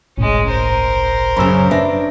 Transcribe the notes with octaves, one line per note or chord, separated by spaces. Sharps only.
G1 C2 A2 G#3 C#4
A#4 C5
F#2 C#3 B5 C#6 E6
D4 B4 E5 A#6